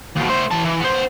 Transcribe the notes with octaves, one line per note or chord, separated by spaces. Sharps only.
D#2 B2
A3 C5
E3 A5
E3
B3 C5